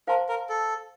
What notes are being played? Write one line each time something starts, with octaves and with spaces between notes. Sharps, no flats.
A#4 C5 F5 A5 C6
A#4
A4